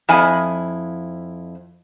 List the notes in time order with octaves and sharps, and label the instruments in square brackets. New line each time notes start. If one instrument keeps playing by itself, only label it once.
[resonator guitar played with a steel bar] F2 E4 G#5